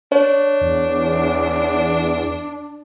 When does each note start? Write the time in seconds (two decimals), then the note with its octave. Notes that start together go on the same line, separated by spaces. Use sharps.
0.12 D4 C#5
0.61 E2